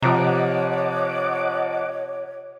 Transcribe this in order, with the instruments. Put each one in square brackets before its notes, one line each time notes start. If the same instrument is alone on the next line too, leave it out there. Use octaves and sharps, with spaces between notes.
[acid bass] C3 [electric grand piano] F3 A#5 [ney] C#5 [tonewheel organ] D#5 F#5 D6